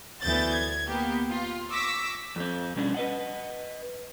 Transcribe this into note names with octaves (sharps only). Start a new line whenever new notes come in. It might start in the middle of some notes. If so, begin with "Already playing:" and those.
D2 E3 B3 G6 A6
G#6
A#3 B3 G4
F4
C#6 D6 E6 A#6 B6
F2 C4
B2 G3 C#4 D4
B4 D#5 F#5